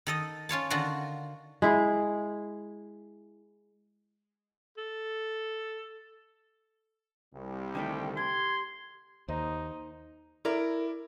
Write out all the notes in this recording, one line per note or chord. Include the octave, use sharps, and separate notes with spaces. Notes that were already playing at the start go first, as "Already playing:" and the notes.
D#3 A4 D#5
C#4 F4 C#5 A5
D3 D#3 F4 F#4
G#3 E4 G#4
A4
C2 G3
D3 D#3 A3 G5
G4 C6 G#6
D#2 D#4 C5 D#5
E4 A#4 D5